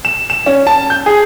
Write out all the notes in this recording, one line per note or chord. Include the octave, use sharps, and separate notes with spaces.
E7
E7
C#4
A5
G6
G#4